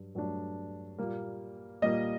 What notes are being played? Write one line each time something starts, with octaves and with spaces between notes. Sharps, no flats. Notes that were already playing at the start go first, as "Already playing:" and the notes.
Already playing: G2 F#3
G2 F#3 A3 D4
A#2 G3 A#3
A#2 G3 A#3 D#5